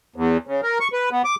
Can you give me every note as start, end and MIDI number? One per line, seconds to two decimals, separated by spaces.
0.16 0.37 40
0.47 0.61 49
0.63 0.78 70
0.80 0.88 85
0.93 1.09 71
1.12 1.22 59
1.25 1.35 86